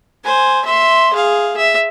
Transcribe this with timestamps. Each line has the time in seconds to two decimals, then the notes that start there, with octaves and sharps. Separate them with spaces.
0.24 C5 G#5
0.65 E5 C6
1.13 G#4 F5
1.57 E5